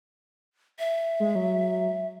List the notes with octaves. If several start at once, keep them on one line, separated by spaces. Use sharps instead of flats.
E5
G#3
F#3